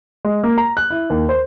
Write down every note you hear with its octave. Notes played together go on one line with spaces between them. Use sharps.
G#3
A#3
A#5
F#6
E4
D#2
C5